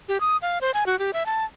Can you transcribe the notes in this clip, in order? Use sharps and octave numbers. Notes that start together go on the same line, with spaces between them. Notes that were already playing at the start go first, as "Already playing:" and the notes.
G4
D#6
F5
C5
G#5
F#4
G4
E5
A5